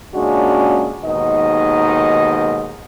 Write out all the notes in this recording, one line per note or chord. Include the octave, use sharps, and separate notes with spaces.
A#2 C#3 G#3 C#4 D4 F#4
D#2 G#2 B2 D#3 D#4 D#5